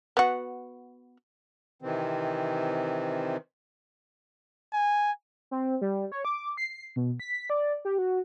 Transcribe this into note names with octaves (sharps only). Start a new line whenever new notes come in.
B3 F#4
C3 D#3 E3 C4
G#5
C4
G3
C#5
D6
C7
B2
B6
D5
G4
F#4